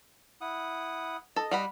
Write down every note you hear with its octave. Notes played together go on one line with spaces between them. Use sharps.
E4 F#5 D#6
A4 D#5
G3 F#5 B5